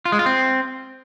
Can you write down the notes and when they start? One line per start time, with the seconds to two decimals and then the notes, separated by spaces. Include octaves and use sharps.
0.05 F4
0.12 G#3
0.19 F4
0.26 C4